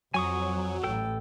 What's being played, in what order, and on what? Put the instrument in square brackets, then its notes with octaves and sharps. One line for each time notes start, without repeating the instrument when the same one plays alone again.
[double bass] F2 [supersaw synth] F#3 [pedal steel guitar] G#5 C#6 D#6
[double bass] A1 A2 [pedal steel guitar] A4 G5